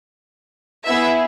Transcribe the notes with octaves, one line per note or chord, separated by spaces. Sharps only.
B3 E4 G#4 E5